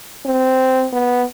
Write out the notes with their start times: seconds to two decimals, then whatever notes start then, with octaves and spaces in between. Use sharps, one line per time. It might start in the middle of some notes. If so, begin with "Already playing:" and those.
0.26 C4
0.93 B3